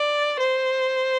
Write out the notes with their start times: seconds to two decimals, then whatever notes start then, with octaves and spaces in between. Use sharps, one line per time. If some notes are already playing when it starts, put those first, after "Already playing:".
Already playing: D5
0.40 C5